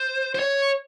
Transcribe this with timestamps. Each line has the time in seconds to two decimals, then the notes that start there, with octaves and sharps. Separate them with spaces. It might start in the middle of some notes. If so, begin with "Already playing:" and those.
Already playing: C5
0.35 C5
0.39 C#5